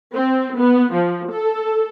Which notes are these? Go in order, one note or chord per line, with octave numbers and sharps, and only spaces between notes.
C4
B3
F3
A4